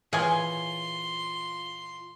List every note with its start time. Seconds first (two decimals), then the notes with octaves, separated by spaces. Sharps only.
0.13 A#2 E3 F4 G#4 C#5 F5 G#5 C6